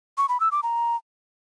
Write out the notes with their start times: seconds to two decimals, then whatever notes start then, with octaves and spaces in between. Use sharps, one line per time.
0.18 C#6
0.29 B5
0.40 E6
0.52 D6
0.63 A#5